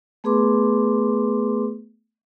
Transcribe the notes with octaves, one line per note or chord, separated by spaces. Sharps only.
A3 B3 G#4 B4 C6 D6